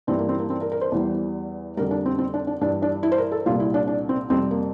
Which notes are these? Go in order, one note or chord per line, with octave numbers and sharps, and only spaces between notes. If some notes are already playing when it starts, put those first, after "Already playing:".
G2 E3 G3 C4
A#3
C4
A#3
C4
A#4
A#4
C5
E2 E3 G3
F2 D3 G3 A#4
D4
C4
C4
D4
D4
G2 E3 G3 D4
D4
E4
C5
A#4
A4
C2 A#2 G3 F4
E4
D4
D4
C4
F2 C3 G3 C4
A#3